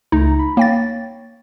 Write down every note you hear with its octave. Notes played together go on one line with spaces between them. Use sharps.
C#2 A3 D#4 A#5
B5
A#3 C#5 G5 A6